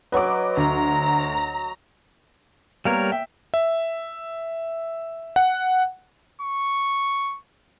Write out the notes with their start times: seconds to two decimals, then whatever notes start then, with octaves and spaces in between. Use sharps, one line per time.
0.12 F#3 B4 C#5 D#5 D6
0.57 D2 A#5
2.85 G3 A#3 B3 A#4 C#5
3.12 E5 G5
3.54 E5
5.36 F#5
6.41 C#6